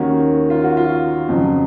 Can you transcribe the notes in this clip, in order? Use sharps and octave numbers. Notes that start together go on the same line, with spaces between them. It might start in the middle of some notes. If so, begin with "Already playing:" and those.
Already playing: D#2 D#3 A#3 C#4 F#4
F4
F#4
F4
F2 C#3 F#3